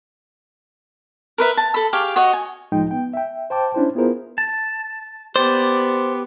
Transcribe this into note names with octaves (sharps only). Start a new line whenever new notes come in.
A#4 B4 E5
A5
A4 B5
G4 G#4 F5 C#6
F#4 C#5 D#5
G#5
C2 A2 F3 G#3 D#4 G5
B3 G5
E5 G5
C5 G5 A5 D6
C#4 D4 E4 C5
B3 E4 F4 G#4 A#4 C5
A5
B3 G4 C5 D5